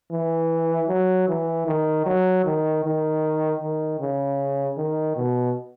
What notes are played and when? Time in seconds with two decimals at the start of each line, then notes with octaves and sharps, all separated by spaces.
0.11 E3
0.88 F#3
1.28 E3
1.67 D#3
2.06 F#3
2.45 D#3
2.84 D#3
3.61 D#3
4.00 C#3
4.77 D#3
5.16 B2